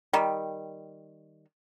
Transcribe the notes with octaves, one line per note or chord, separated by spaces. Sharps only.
D#3 G3